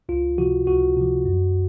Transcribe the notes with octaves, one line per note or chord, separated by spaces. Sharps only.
C#2 F4
C3 F3 F#4
C#2 F#4
C3 F3
F#2